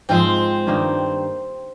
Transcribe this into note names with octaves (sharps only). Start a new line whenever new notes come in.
G#2 F3 G#3 C4
G2 D#3 A#3 D#4